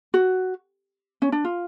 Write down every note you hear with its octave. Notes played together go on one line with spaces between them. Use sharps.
F#4
C#4
D4
F4